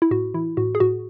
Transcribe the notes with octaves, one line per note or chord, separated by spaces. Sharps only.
E4
A2 F#4
E3 E4
A2 F#4
G#4
A2 F#4